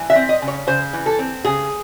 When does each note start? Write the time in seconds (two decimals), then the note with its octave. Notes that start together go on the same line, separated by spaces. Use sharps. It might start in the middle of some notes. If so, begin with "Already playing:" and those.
Already playing: E3
0.10 E5
0.15 C4
0.29 D#5
0.42 C#3
0.48 C#5
0.67 C#3 C5
0.93 E3
1.06 A4
1.19 C4
1.45 C#3 G#4